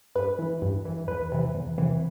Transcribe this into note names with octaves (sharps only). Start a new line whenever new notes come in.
G2 B4
E3
G2
E3
E2 B4
C3 E3
E2
C3 E3